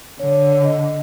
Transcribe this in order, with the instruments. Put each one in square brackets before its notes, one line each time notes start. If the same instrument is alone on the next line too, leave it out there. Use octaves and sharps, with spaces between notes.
[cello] D3 [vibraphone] C#5
[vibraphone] D#5